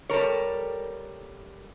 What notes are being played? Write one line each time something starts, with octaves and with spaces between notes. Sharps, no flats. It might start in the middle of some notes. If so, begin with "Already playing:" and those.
G3 A4 A#4 C#5